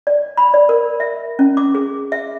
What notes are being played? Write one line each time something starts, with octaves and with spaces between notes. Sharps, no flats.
D5
B5
D5
A#4
E5
C#4
D6
G#4
E5